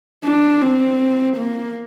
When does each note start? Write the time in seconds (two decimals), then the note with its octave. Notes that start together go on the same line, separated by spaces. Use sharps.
0.24 D4
0.62 C4
1.37 A#3